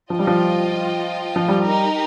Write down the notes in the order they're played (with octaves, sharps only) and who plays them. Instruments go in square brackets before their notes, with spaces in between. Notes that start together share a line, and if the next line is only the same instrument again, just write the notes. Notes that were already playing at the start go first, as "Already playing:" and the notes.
[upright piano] F3 [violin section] F4 D#5 G5
[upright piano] G3
F3
F3
G3
[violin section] D#4 G4 A#4